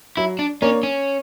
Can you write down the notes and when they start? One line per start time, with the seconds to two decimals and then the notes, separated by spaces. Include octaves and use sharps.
0.17 F#3 E4
0.39 D4
0.62 A#3 C#4 D4 A#4 C#5
0.83 C#4